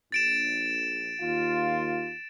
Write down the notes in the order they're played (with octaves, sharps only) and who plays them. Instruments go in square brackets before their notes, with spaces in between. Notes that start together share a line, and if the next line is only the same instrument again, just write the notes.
[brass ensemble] A#1 [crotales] A6 D7 E7
[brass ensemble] D#2 F4